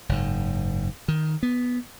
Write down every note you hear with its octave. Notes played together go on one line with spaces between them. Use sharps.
F#1 G#2
D#3
B3